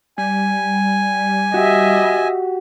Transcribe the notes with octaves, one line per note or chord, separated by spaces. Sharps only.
G3 G#5
F#4 G4 D#5 E5